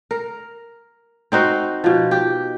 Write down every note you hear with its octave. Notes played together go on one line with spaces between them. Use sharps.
A#4
C4 D#4 F#4 C5
B2 F3
G4